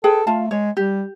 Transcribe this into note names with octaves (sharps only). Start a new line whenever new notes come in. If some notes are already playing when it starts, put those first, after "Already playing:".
G#4 A4 B4 G5
A3 F4 F5 A5
G#3 C#5
G3 G4